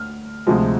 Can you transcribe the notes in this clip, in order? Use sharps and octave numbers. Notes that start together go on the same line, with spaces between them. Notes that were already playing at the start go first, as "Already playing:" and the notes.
Already playing: D2 F6
D2 C3 F3 G#3